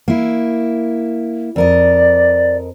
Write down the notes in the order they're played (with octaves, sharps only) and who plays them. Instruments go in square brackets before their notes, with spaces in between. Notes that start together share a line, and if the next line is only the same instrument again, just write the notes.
[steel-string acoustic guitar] A#3 E4
[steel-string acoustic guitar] F2 A#4 D#5 [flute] D5